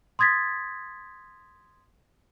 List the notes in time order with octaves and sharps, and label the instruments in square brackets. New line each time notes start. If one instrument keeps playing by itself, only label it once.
[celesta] C6 D#6 G#6 A6 B6